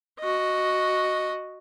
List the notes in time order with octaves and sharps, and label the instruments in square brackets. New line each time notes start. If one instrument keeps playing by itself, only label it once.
[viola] F#4 D#5